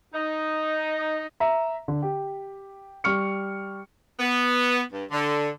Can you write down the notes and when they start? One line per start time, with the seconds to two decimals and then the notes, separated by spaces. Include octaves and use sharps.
0.14 D#4
1.40 E5 A#5
1.88 D3
2.02 G4
3.04 G3 C#6 F6 C#7
4.19 B3
4.92 G2
5.10 D3